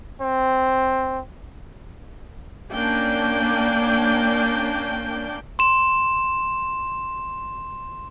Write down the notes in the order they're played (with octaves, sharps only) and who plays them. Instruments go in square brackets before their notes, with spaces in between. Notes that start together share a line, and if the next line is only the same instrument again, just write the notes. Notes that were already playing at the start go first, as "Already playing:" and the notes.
[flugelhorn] C4
[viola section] A#3 C#4 D4 G5
[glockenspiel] C6 E7